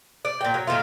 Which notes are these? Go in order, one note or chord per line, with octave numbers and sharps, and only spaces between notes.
D5
A#2 G5
F#3
A#2 D#3 A3 F4